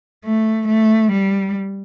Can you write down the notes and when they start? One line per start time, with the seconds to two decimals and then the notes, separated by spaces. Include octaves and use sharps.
0.25 A3
0.68 A3
1.12 G3